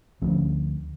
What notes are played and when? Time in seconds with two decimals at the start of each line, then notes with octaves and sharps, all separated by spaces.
0.22 D2 F3 C#4